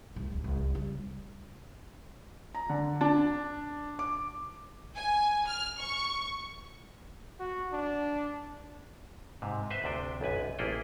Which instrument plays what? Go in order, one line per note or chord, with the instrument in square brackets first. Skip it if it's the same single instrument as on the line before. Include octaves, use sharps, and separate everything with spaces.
[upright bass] C2
D1
C2
C#3 G3
[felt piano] A#5
D3
D4
D6
[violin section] G#5
F6
C#6
[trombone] F#4
D4
[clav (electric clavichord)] G#2 C3
B4 C5 D#5 E5
D2 C3 D4 G5
B1 F#2 B4 G#5
A1 A#3 E4 G#4 A4 G5